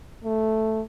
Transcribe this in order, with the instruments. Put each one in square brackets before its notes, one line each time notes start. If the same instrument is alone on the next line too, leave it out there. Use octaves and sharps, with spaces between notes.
[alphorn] A3